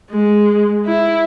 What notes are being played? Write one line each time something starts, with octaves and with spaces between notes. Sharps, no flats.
G#3
E4